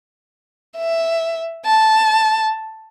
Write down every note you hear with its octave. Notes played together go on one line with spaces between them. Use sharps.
E5
A5